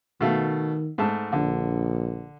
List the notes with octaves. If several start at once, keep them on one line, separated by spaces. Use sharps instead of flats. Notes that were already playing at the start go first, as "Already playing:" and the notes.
B2 D#3 A3 F5
G#2 A3 A5
A#1 D3